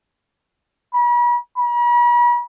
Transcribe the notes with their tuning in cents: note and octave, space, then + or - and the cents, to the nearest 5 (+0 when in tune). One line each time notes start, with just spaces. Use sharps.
B5 -40
B5 -45